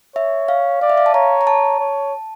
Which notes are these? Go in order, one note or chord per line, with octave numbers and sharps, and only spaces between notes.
C#5 E5
F5
D5 F5
E5
F5
A5
C#5 A#5
A#5
A5
C#5